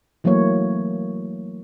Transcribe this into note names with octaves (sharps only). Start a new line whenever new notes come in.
E3 F#3 A3 A#3 C#5